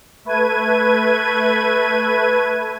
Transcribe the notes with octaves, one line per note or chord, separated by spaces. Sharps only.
A3 B4 G#6 D#7